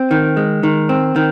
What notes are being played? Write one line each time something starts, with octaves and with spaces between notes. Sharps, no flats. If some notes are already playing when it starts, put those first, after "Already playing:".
Already playing: C4
D#3
G#3
D#3
C4
D#3